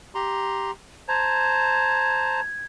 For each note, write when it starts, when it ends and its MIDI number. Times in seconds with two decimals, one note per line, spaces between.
0.15 0.71 67
0.15 0.71 82
0.15 0.71 84
1.08 2.41 72
1.08 2.41 81
1.08 2.41 82
1.08 2.66 92